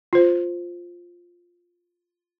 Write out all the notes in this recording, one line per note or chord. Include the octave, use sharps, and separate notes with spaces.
F4 C5